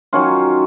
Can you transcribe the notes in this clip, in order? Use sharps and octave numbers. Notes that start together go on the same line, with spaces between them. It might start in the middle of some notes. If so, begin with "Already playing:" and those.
D#3 F#3 C#4 F4